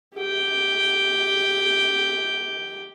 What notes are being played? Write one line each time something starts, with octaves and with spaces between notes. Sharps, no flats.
G4 G5